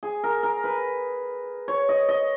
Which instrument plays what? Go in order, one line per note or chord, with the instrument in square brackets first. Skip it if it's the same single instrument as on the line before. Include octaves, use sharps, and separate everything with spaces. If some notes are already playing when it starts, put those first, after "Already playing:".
[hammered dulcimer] G#4
A#4
A#4
B4
C#5
D#5
D#5